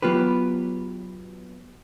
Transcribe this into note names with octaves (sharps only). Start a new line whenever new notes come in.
F#3 B3 F4 G4 B4